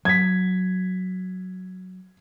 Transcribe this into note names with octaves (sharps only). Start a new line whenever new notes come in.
F#3 G#6 B6